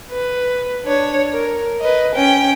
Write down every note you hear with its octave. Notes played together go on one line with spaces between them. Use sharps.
B4
D4 C#5
A#4
B4 D#5
C#4 G5